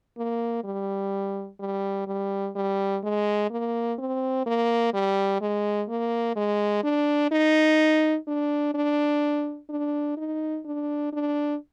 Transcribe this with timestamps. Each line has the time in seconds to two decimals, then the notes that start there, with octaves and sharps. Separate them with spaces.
0.17 A#3
0.64 G3
1.60 G3
2.07 G3
2.56 G3
3.03 G#3
3.50 A#3
3.98 C4
4.46 A#3
4.94 G3
5.41 G#3
5.89 A#3
6.36 G#3
6.84 D4
7.31 D#4
8.27 D4
8.74 D4
9.69 D4
10.17 D#4
10.65 D4
11.13 D4